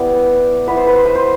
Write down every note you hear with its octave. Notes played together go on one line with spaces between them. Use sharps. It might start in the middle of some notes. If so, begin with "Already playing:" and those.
Already playing: G3 B3 E4 D5
B3 E4 B4
C5
B4
C5
B4
C5